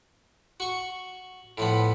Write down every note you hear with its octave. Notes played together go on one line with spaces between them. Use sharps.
F#4 C#6
A2 F3 B3